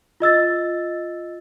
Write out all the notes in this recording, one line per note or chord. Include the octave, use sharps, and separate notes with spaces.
F4 D#5 E6 A6